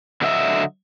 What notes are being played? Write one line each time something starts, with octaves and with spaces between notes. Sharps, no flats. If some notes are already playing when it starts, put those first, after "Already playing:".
D3 F#3 D#5 E5